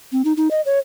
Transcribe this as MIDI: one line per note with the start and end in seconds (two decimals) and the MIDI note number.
0.12 0.22 60
0.25 0.33 63
0.37 0.48 63
0.51 0.61 75
0.66 0.79 73